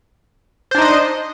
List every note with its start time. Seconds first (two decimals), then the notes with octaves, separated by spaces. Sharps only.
0.71 C5
0.75 D4
0.78 D#4
0.81 D#5